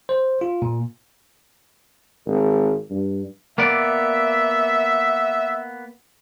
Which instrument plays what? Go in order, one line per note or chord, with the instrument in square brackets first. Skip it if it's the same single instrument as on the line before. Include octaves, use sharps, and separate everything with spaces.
[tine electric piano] C5
F4
A#2
[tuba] G#1
G2
[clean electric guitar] A#3 B3 D5 [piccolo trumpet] E5